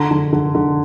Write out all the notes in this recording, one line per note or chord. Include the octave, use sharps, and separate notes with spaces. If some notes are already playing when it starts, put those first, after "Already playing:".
Already playing: D3 A#5
D3
D3
D3